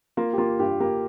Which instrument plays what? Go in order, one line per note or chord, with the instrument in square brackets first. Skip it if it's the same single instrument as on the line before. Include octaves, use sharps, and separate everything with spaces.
[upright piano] A#3 [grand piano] F4
[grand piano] G4
[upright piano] A#3 [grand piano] F4
[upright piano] G2 [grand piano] G4
[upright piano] A#3 [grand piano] G4